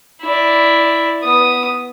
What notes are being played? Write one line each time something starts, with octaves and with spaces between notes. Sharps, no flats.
E4 D5
B3 D#6